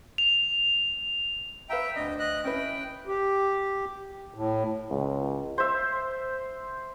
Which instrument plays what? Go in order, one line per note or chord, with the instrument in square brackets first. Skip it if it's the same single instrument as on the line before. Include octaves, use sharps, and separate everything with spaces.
[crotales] F7
[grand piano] B4 F5 A#5 [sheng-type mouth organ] E5 G5
[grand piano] D2 D4 [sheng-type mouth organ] D#5
[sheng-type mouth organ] D#5 F#6
[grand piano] C#4 E4 B4 [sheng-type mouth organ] G5
[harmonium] G4
A2
[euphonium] C#2
[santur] C5 E5